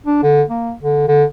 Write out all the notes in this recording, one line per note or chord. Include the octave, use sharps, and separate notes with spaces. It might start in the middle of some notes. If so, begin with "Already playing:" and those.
D4
D3
A#3
D3
D3